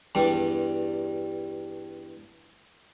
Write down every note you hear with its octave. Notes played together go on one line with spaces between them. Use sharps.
E2 G2 G3